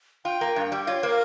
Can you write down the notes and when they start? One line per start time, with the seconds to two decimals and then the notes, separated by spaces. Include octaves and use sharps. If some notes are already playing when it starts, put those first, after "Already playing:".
0.25 F4 G5
0.41 A#3
0.56 G2
0.72 G3
0.87 F4 C#5
1.03 A#3 C5
1.07 A#4